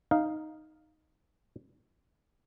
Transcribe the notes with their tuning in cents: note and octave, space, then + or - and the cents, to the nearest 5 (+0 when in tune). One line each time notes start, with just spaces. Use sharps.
D#4 +0 F5 +0